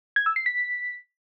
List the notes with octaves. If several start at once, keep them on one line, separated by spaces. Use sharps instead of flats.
G#6
E6
C7
B6